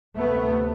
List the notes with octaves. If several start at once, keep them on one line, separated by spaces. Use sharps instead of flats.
D2 C3 A3 B3